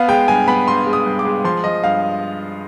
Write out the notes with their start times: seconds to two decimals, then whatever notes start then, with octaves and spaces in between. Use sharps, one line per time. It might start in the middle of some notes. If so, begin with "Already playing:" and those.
Already playing: B3 F5
0.08 G#3 G5
0.28 G2 G#5
0.48 B3 B5
0.67 G2 C6
0.87 G#3
0.93 D#6
1.06 G2
1.19 D6
1.25 G#3
1.44 F3 C6
1.64 F3 D#5
1.84 G2 F5